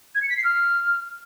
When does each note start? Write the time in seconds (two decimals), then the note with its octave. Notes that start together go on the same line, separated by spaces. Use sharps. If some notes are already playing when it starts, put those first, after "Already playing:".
0.15 G#6
0.22 C#7
0.30 B6
0.37 C7
0.44 F6